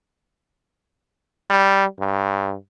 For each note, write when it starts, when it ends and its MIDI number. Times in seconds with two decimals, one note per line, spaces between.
1.50 1.85 55
2.00 2.55 43